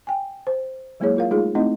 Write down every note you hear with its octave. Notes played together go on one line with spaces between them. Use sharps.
G5 G#5
C5
F#3 G#3 A#3 E4 G#4 C#5
F4 A#4 F5
G#3 A3 D#4 F4 G#4
A3 C4 D#4 E4 D#5